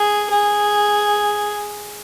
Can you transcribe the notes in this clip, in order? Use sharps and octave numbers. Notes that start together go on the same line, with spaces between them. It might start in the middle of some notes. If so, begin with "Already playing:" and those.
Already playing: G#4
G#4